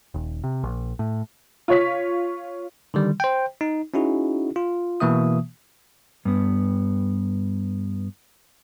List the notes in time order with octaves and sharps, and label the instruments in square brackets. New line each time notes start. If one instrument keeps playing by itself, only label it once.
[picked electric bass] D#1
C3
A#1
A2
[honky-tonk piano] F4 C#5 B6
[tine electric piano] D3 D#3 G3
C5 G5
D#4
C#4 D#4 E4 F#4 G#4
F4
B2 E3 A#3 E5 D#6
[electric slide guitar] G2 B3